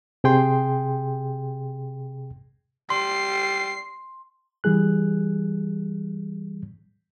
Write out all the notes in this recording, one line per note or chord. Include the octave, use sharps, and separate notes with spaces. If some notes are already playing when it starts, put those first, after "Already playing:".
C3 G#4 G5 C6
G3 C6 C7
E3 G3 G#4 F#6